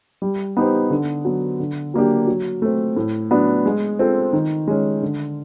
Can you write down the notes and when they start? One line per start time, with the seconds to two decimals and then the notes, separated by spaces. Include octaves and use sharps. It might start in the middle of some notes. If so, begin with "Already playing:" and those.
0.22 G3
0.57 B3 D#4 G4 C5
0.91 D3
1.25 F#3 B3
1.60 D3
1.94 F#3 A#3 D4 G4
2.27 F#3
2.62 A3 C4
2.96 A2
3.31 F#3 B3 D4
3.66 G#3
3.99 C4 F4 A4 C5
4.33 D#3
4.68 G#3 C#4
5.03 D3